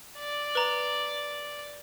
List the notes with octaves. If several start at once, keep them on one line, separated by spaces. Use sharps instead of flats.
D5
B4 A#5